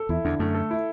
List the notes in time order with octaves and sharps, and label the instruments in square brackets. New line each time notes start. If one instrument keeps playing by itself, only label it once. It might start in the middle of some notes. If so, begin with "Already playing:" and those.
Already playing: [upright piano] A4
[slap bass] E2 [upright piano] E4
[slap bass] E2 [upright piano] D3
[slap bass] F#2 [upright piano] A3
[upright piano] A4
E4